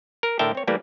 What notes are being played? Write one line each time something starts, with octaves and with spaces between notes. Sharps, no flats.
A#4
A2 D3 A#4 E5 G5 A5
C4 C#5
E3 G3 A3 A#3 E4